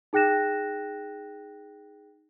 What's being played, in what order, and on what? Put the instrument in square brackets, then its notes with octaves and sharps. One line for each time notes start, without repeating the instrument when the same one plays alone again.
[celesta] D#4 G#4 G5 F#6 A#6 E7